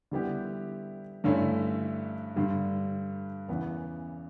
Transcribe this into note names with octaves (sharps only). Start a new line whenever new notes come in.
D3 G3 B3 E4 G4
G2 D3 A3 C#4 E4
G2 D3 G3
E2 C#3 E3 B3